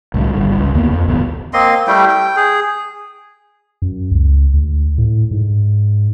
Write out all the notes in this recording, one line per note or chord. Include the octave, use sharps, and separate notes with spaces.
C2 A2 D3
G#1 G2 D3
C#2
D#2 D3 A#3 B3
F2
D#1 A1 D2 B3
A#3 C4 D#5 C6
G3 A3 E4 G5
G5
G#4
F#2
C#2
D2
A2
G#2